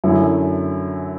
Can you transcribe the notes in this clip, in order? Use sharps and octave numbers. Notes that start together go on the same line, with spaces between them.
F#2 D3 F#3 C#4 E4